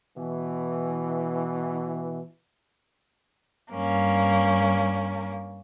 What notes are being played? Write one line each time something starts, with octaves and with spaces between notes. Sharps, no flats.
B2 E3
G2 A#3 C#4